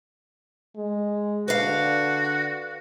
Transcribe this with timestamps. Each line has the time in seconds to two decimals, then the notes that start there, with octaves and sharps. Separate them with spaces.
0.76 G#3
1.48 D3 F#4 B4 D5 F5